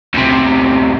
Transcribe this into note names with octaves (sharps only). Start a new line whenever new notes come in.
D2 C3